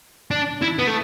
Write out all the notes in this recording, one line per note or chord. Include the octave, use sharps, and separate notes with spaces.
D4
E4
B3
A3